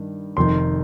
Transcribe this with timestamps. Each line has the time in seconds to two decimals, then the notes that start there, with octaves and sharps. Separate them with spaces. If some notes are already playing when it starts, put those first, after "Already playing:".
Already playing: G2 D#3
0.37 F1 F2 D#3 C6